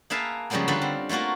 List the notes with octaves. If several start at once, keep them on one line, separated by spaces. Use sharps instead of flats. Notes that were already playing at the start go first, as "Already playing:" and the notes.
A#3 G#4 B4 E5 F5 A5
C#3 F3 G3 G#3 A#3 B3
D3 G3 D4 F4 A4 B4
C4
A3 A#3 F4 F#4 A#4